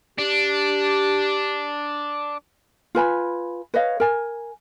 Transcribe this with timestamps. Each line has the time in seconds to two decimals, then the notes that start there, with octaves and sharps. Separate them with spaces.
0.18 D4 G4
2.95 F4 B4 G#5 B5
3.74 B4 C#5 D#5 F5
4.00 A#4 G#5